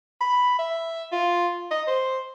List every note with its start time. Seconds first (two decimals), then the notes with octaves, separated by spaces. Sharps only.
0.21 B5
0.59 E5
1.12 F4
1.71 D#5
1.87 C5